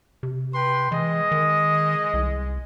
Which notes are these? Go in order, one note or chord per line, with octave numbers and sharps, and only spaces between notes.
C3
B4 G5 C6
E3 G#3 D#5
D#3
C2